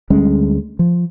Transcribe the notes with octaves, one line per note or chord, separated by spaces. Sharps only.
D2 G3 G#3 C#4
F3